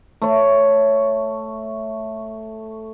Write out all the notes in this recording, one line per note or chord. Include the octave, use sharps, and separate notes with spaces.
A3 C#5